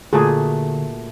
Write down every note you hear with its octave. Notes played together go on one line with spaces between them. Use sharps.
A#2 D3 A3 F#4 G#4